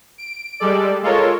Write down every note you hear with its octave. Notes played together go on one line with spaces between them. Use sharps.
D7
G3 G#3 A4 D5
G#3 F4 A4 A#4 C#5